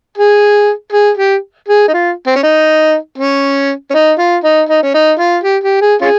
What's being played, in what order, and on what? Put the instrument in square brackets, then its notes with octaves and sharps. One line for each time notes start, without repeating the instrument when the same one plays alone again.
[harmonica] G#4
G#4
G4
G#4
D#4
F4
C4
C#4
D#4
C#4
C#4
D#4
F4
D#4
D#4
C#4
D#4
F4
G4
G4
G#4
C#4 F4 G#4